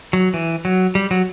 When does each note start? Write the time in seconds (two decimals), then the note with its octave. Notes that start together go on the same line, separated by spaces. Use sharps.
0.13 F#3
0.34 E3
0.65 F#3
0.95 G3
1.11 F#3